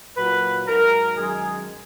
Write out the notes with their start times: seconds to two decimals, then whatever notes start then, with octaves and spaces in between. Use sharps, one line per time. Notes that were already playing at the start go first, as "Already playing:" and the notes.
0.16 A#2 F#3 B4
0.66 G#2 F#3 A#4
1.15 F#2 D#3 G#3 G#4